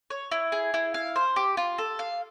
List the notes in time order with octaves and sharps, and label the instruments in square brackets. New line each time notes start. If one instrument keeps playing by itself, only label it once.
[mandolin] C#5
E4
G#4
E4
F5
C5
G4
F4
A4
F5